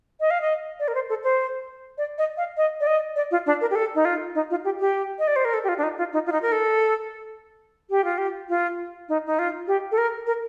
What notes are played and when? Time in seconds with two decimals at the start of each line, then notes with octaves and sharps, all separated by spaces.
0.20 D#5
0.31 F5
0.42 D#5
0.80 D5
0.88 A#4
0.95 C5
1.09 A4
1.24 C5
1.98 D5
2.18 D#5
2.37 F5
2.57 D#5
2.80 D5
2.87 D#5
3.16 D5
3.31 F4
3.46 D4
3.61 A#4
3.71 G4
3.75 A4
3.95 D#4
4.05 F4
4.35 D#4
4.50 F4
4.64 G4
4.80 G4
5.19 D#5
5.28 D5
5.36 C5
5.45 A#4
5.54 A4
5.64 G4
5.69 F4
5.78 D4
5.83 D#4
5.98 F4
6.13 D#4
6.26 F4
6.32 D#4
6.42 A#4
6.52 A4
7.90 G4
8.05 F4
8.18 G4
8.49 F4
9.09 D#4
9.27 D#4
9.39 F4
9.67 G4
9.92 A4
9.98 A#4
10.27 A#4